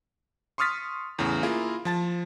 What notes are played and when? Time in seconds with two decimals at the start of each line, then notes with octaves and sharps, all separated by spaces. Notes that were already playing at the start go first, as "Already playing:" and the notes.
0.58 C6 C#6 D#6 F6 A6 B6
1.19 E2 A2 C#3
1.43 A#3 E4 F4 G#4 A#4
1.85 F3 A5 A6